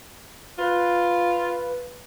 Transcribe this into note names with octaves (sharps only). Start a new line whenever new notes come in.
F4 B4